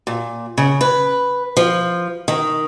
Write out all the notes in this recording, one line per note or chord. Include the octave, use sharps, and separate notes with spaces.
A#2
C#3
B4
F3
D#3